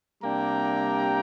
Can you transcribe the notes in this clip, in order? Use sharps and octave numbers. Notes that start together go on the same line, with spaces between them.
C3 G3 A#3 D4 G5 A#5